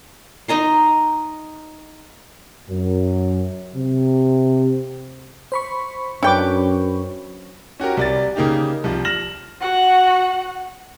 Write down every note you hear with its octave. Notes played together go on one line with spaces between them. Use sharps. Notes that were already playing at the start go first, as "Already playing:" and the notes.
D#4 D#5 A#5 C6
F#2
C3
C5 B5 C#6
F#2 C#4 D4 B4 G5 D6
C#4 F#4 G4 A#4
C2 D5 A6
C#3 A#3 D#4 G4
C2 F3
F6 A#6 E7 F#7
F#4 F#5